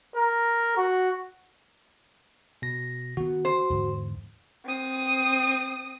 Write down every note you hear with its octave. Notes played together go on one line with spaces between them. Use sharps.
A#4
F#4
B2 A#6
D#3 B3 F#4
C5
E2 G#2 D3
C4 D#6